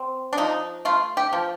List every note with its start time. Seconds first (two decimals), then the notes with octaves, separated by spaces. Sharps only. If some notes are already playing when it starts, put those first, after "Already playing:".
Already playing: C4
0.33 D4
0.37 F3 D#4
0.85 A3 F4
1.17 G4
1.33 F3